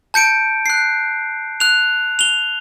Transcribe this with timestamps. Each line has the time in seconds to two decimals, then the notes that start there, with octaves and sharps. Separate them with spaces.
0.14 A5 G6 C#7 D7
0.66 F#6 C7
1.60 F#6 F7
2.19 F7 G7